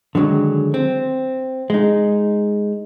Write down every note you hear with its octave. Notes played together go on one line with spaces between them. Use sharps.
D3 D#3 F#3 G#3
C4
G#3 D#4